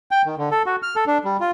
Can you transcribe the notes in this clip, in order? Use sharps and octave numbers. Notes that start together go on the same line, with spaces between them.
G5
D#3
D3
A4
F#4
F6
A4
D4
G3
F4